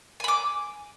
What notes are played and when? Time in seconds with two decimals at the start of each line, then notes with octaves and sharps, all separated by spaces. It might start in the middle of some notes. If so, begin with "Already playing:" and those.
0.20 G#5
0.24 B5
0.28 D6